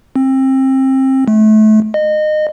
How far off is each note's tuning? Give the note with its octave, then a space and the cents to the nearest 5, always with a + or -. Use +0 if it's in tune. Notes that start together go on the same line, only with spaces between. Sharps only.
C4 +25
A3 -30
D#5 -25